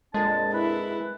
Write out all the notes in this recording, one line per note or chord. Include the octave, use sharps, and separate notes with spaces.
F2 A#2 G#3 D4 A5
E4 B4